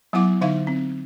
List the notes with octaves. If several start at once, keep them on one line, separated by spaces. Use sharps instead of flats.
F#3 B3 E4 F#5 D6
D3 D#4 E5 F5
C4